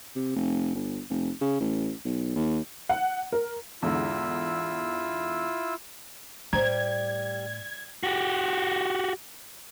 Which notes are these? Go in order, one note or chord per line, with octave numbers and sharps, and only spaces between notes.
C3
F1
G1
F1
C#3
A1
B1
D#2
F#5
A#4
E2 G#2 D3 E4 F4 E6
A2 G3 C5 A#5 G#6
F#4 G4